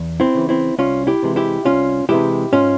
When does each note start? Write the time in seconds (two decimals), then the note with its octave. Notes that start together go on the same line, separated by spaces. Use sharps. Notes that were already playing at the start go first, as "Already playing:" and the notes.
Already playing: E2
0.20 C4 E4
0.35 C#3 E3
0.49 C4 E4
0.78 C2 C#4 F4
1.07 E4 G4
1.23 C3 E3 G#3
1.36 E4 G4
1.65 C2 C#4 F4
2.09 C3 E3 G#3 E4 G4
2.52 G#2 C#4 F4